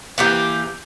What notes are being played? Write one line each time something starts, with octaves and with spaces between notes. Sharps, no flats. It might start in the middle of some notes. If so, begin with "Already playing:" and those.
E3 A#3 G4